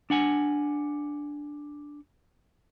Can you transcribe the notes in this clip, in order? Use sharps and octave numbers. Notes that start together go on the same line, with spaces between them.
D4 F#5 G#5